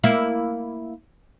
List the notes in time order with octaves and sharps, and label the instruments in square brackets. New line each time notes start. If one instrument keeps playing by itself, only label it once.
[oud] A#3 E4